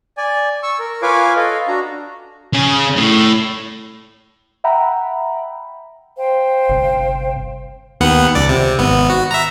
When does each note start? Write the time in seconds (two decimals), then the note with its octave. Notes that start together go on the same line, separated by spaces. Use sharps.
0.17 D5 G#5
0.63 C#6 E6
0.79 A#4
1.02 F4 B4 C#5 F5 G#5 D6
1.36 A4 D#5 F5
1.68 D4 F#4 A#5
2.54 C#3 G#4
2.97 A2
4.64 E5 F#5 G5 A#5 B5
6.17 C5 F5 G5
6.69 G1 C3
8.01 D#2 B3 F#5
8.35 C#2 D5
8.49 C3
8.78 G#1 B3
9.10 F#4
9.31 E5 A#5